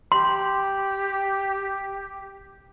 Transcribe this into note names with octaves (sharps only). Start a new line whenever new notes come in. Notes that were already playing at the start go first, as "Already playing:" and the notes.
G4 C6